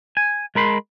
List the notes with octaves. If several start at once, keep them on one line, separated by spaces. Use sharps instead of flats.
G#5
G#3 A#4 B5 C6